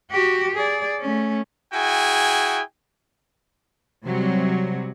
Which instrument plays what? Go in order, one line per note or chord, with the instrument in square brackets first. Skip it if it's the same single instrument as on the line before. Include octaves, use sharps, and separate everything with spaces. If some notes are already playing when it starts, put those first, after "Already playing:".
[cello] F#4 G4
G#4 D5
A3 C#4
[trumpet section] E4 F#4 G#4 G5 G#5
[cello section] C3 F#3 G3